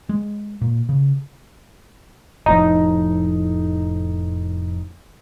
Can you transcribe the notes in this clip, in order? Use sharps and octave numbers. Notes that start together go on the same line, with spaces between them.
G#3
A#2
C#3
F1 A2 F3 D#4